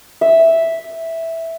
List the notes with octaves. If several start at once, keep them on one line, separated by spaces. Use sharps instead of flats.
E5